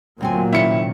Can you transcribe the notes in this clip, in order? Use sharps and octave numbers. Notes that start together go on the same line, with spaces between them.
D2 A#2 F#3 C4 G#5
C3 D#3 C#4 E4 C#7